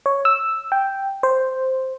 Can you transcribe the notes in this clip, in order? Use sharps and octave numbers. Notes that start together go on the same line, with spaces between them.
C#5
E6
G5
C5